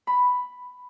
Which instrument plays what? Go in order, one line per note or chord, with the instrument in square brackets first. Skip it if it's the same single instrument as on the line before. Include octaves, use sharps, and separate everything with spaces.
[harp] B5